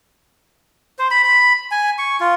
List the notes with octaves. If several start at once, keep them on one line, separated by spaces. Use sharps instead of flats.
C5
B5
B5
G#5
C#6
F4